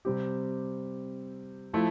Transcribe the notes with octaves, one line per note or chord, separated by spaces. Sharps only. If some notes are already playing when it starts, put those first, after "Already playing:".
C3 G3 C4 G4
F3 A3 E4